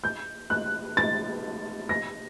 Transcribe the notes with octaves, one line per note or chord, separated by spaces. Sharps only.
G6
F#6
A6
A#6